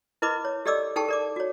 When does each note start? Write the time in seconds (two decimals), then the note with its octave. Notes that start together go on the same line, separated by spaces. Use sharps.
0.22 E4 A#4 B4 D#5 B5 D6
0.45 C#5
0.66 G4 A4 D5 D#5 D6 E6
0.96 D#4 G#4 A4 G5 A5 C#6
1.08 A#4 D5 D6
1.36 F#4 C#5